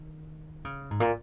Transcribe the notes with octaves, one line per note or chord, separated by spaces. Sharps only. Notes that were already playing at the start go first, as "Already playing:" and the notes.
Already playing: D#3
C#3
G#2
A#2